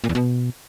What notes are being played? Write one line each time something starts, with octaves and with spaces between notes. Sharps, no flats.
A#2
E2
B2